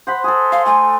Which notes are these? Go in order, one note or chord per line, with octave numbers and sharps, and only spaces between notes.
C5 F#5 B5
G#4 A4
F5 C6
A3 G#5